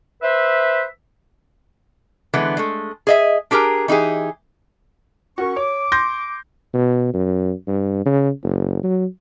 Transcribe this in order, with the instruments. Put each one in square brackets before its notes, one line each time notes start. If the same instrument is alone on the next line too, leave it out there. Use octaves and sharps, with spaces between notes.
[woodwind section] B4 C5 E5
[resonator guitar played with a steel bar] D3 E3 G#3 B3
G#3 A3
G#4 D#5 E5
D4 G4 G#4 A#4 A#5
E3 D#4 G4 G#4
[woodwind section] C#4 C#6 [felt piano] F#4 A#4
[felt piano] C#5 [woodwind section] D6
[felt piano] C6 G6 A#6
[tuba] B2
F#2
G2
C#3
F#1
F#3